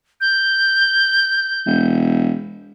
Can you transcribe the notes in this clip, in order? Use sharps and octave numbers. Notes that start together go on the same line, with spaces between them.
G6
E1